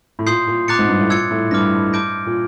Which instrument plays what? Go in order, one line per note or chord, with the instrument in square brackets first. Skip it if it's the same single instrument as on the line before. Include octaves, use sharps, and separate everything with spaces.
[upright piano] A2
[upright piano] A#2 [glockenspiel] C6 D#6 G6 C7
[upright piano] A#2
[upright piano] A#2 [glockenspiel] A#5 D6 F#6 A6 C#7
[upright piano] G#2
G2
A2
[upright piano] A#2 [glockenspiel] E6 G#6 C#7
[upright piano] A2
[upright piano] G2 [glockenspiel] D6 F6 A#6
[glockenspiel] A5 D6 G6 A#6 D7
[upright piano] A#2